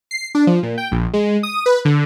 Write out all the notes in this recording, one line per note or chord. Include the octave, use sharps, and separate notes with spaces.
C7
D4
F3
A#2
G5
A#1
G#3
D#6
B4
D3